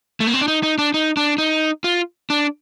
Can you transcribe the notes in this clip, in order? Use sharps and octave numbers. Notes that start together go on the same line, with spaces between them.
A3
A#3
C4
D4
D#4
D#4
D4
D#4
D4
D#4
F4
D4